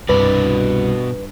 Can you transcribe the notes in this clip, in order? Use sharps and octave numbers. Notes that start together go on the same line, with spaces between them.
C2 G2 B2 B4 D5